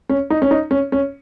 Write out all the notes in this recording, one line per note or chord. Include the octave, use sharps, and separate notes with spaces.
C#4
D#4
C#4
D#4
C#4
C#4